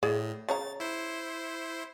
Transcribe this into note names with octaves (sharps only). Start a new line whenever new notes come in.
A2 G#4 D5
C#3 C#5 A#5 A6
E4 C5